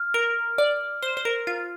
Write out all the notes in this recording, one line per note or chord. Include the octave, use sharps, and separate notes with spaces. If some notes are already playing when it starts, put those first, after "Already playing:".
Already playing: F6
A#4
D5
C5
C5
A#4
F4